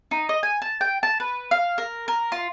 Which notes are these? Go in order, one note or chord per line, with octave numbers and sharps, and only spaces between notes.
D#4
D#5
G#5
A5
G5
A5
B4
F5
A#4
A#4
F4